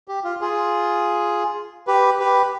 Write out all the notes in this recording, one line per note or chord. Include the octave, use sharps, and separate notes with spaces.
G4
F4
F4 G#4
G4 B4
G4 B4